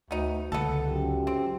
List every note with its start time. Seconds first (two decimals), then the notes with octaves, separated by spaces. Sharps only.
0.11 D2 B3 D#4
0.52 C#2 D3 B3 A4
0.88 F#2 F4 G4
1.27 C4